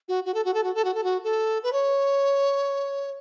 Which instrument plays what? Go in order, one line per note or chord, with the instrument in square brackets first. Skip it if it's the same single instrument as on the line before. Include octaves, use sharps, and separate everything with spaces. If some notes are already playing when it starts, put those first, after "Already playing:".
[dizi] F#4
F#4
A4
F#4
A4
F#4
A4
F#4
A4
F#4
A4
B4
C#5